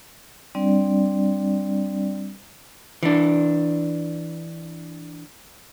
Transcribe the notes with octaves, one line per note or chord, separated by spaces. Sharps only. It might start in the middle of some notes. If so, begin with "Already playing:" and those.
G3 C4 D4 D5
E3 D4